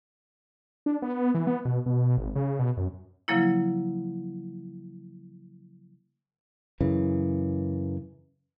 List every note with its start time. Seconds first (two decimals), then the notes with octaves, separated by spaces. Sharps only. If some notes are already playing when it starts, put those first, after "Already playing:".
0.86 D4
1.02 B3
1.35 E3
1.47 B3
1.65 B2
1.86 B2
2.18 G#1
2.36 C#3
2.59 B2
2.77 F#2
3.28 C#3 F3 F#3 A#3 E4
6.81 F#2 C#3 E3